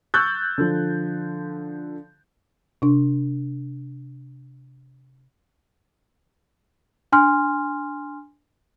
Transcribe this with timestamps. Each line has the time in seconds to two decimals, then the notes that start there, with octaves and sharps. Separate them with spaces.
0.14 C#6 E6 F#6 G6 A6
0.58 D3 F3
2.82 C3 D4
7.12 D4 G#5 C6 F6